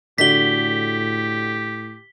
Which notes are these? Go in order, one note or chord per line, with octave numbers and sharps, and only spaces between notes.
A2 D3 D4 F#4 G4 B6 G7